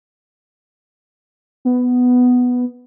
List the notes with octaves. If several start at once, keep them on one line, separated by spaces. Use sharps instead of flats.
B3